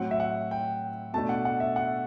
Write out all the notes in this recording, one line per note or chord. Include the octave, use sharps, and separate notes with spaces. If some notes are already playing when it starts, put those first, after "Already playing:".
Already playing: A2 F#3 C4 F#5
E5
F#5
G5
B2 A3 D4 A5
F#5
F#5
E5
F#5